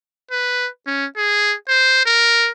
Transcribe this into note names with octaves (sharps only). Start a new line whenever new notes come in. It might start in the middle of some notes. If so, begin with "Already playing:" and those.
B4
C#4
G#4
C5
A#4